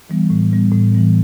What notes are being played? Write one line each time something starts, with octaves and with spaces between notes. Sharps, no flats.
E3 G3 B3
A2
E3 G3 B3
A2
E3 G3 B3